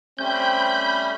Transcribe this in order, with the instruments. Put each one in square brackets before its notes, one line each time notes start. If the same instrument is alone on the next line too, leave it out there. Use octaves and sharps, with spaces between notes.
[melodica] G3 A3 C#4 [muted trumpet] C4 [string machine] B5 [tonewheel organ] G6